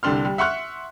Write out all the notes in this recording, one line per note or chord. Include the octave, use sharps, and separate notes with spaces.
C2 D3 G3 D4 C6 F6
G3
E5 F#5 C6 C#6 F6 F#6